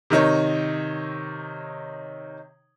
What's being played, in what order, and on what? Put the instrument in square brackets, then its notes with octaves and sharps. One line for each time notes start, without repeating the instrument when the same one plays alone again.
[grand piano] C3 D#3 D#4 C#5